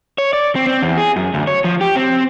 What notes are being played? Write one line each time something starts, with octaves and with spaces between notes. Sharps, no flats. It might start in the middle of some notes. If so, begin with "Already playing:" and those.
C#5
D5
C4
C4
E2
G#4
F#2
D2
C#5
F3
G4
C4